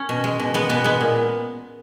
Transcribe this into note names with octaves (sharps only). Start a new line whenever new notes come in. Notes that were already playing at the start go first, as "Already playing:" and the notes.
Already playing: C#4
B2
G#3
B2
G#3 B3
B2 B3
G#3 B3
A#2